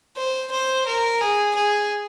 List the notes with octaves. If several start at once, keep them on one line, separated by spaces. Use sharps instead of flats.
C5
C5
A#4
G#4
G#4